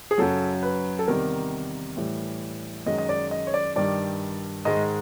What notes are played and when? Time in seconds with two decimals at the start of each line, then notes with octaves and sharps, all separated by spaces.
0.11 G#4
0.18 F#2 C#3 F#3 A4
0.63 B4
0.99 A4
1.07 E2 C3 D#3 G3 A#4
1.97 A2 E3 G3
2.86 F#2 D#3 G#3 D#5
2.98 D#5
3.09 D5
3.31 D#5
3.47 C#5
3.54 D5
3.76 G2 D#3 G3 D5
4.65 G#2 D#3 G#3 D#5